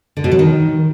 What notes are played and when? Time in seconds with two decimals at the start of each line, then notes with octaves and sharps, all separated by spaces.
0.17 D3
0.24 B2
0.32 F#3
0.39 D#3